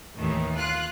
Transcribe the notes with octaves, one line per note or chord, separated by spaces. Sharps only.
D#2 A2 D#3 E3
F4 F#6